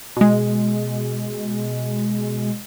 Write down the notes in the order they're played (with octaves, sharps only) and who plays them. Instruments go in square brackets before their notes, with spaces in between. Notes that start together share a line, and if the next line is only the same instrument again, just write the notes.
[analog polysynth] B2 G#3